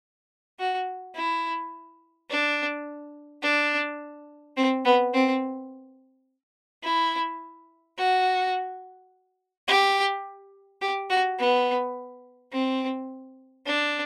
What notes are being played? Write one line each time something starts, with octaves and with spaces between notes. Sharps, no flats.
F#4
E4
D4
D4
C4
B3
C4
E4
F#4
G4
G4
F#4
B3
C4
D4